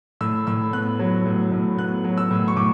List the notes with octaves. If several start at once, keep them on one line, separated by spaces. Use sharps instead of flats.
A2 E6
A2 E6
B3 F#6
F#3
A2
A2
B3 F#6
F#3
E6
A2
C#6
A2 D6